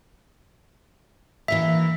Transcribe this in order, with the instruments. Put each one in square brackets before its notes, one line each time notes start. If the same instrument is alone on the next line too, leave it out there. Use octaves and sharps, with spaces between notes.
[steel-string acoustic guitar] E3 A#3 E4 [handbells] E5